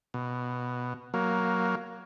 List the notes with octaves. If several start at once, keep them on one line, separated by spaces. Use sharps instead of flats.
B2
F#3 A#3